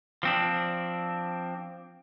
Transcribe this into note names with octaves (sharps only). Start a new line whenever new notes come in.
F3 C4 D4